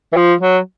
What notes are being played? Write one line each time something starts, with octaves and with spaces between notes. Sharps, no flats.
E3
F3
F#3